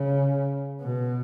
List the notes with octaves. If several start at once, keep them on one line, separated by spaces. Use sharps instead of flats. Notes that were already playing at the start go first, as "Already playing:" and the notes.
Already playing: C#3
B2